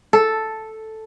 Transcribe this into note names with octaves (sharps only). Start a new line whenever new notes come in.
A4